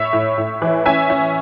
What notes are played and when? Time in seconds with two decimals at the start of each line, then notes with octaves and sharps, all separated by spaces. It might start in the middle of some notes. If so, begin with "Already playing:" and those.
Already playing: A2 C#5 E5
0.13 A2
0.38 A2
0.62 E3
0.86 C#4 E5 G#5
1.10 C#4